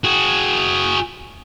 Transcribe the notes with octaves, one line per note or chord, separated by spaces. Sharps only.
F#4 G#4